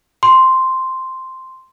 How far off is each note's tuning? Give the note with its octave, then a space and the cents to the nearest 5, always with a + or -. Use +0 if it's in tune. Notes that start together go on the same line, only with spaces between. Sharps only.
C6 +0